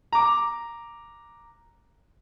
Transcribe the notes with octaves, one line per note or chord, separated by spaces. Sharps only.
A#5 D6